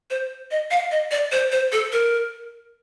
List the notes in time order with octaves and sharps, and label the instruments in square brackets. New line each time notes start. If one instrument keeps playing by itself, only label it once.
[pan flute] C5
D#5
F5
D#5
D5
C5
C5
A4
A#4